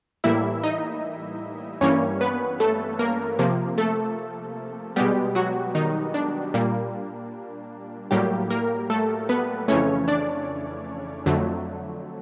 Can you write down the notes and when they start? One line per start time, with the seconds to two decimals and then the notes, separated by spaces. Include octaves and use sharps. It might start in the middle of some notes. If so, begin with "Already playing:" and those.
0.24 A2 E3 G3 A#3 E4 E5
0.63 D#4 D#5
1.81 G2 E3 G3 A#3 C#4 C#5
2.21 B3 B4
2.60 A3 A4
2.99 A#3 A#4
3.39 C3 F3 A#3
3.78 A3 A4
4.96 B2 G3 G#3 B3 G4
5.35 F#3 F#4
5.75 D#3 D#4
6.14 D4
6.54 A#2 G3 A#3
8.11 A2 F#3 G3 A#3 G4
8.50 A#3 A#4
8.90 A3 A4
9.29 B3 B4
9.68 F2 C#3 E3 A3 C#4 C#5
10.08 D4 D5
11.26 F2 D3 F#3 A3